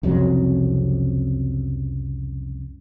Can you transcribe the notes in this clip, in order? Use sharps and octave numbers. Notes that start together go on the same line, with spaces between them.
C2 F2 C#3 F#3